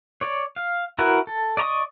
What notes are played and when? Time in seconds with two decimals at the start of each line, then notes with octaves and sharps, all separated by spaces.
0.21 C#5 D5
0.56 F5
0.99 E4 F#4 A#4 B4 E5
1.27 A4
1.57 D5 D#5 A#5 C#6 D#6